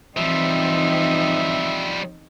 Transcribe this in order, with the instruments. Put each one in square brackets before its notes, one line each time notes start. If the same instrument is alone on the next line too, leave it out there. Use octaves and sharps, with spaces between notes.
[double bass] E3 C4 [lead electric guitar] F3 G3 [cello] D#4 [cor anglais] E5